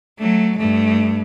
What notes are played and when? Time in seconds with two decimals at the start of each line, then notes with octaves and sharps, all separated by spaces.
0.19 F#3 A3
0.58 G2 A3